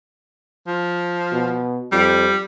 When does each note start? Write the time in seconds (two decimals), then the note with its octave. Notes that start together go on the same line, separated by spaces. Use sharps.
0.67 F3
1.32 B2
1.92 F2 G3